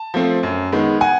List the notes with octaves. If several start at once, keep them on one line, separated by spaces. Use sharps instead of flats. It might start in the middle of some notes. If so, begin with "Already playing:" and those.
Already playing: A5
F3 A3 C4
F#2
D#3 G#3 B3
F#5 G#5